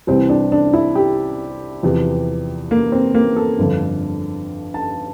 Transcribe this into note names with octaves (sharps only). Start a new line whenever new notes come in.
C2 C3 E3 C4
D4
D4
E4
G4
E2 C3 F3
A#3
C4
A#3
A4
G1 F2 D3
A5